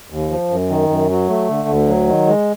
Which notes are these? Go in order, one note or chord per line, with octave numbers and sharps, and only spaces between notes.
D#2
F3
F#2
D#3
F#2
F#3
A3
D3
D2
F#3
D#3
G#3